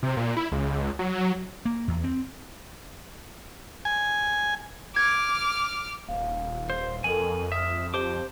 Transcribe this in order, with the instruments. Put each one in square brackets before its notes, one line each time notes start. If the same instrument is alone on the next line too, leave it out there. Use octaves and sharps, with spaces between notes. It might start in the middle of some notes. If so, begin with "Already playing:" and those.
[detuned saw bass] C3
A#2
E4
C#2
F#3
[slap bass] A#3
E2
C4
[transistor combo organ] G#5
[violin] D6 F6 [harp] G#6
[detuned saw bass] D#1 [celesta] F5
[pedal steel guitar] C5
[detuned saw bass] F2 [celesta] A4 A#4 F#7 [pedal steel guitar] G#5
[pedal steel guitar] E5 [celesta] D#6 F6
[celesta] G4 A5 G7 [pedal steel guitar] C5 D6